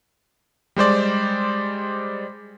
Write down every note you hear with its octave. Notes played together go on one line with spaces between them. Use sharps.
G3 G#3 C5 D5